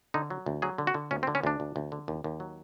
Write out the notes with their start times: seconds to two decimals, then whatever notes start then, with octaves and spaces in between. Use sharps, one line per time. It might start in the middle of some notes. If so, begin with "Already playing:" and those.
0.14 D3 D#4
0.30 F#3
0.46 D2
0.62 F#3 G#4
0.78 D3
0.87 F#4
0.94 D3
1.11 D2 C#4
1.23 C4
1.27 D3
1.35 C#4
1.43 D2 D4
1.60 D2
1.76 D2
1.92 D3
2.08 D#2
2.24 D#2
2.40 F#3